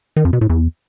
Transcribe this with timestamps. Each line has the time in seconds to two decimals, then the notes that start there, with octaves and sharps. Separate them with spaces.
0.16 D#3
0.25 F2
0.33 B2
0.41 A2
0.49 E2